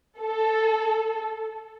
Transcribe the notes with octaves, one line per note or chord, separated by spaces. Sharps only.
A4